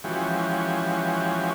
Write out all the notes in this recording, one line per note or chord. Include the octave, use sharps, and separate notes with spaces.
E3 F3 G#3 C#4 F#4 G4